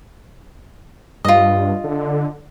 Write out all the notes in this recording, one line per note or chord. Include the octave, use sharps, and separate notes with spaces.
G2 F4 D#5
D3